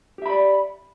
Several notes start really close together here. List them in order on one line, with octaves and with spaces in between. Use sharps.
G4 E5 B5 D5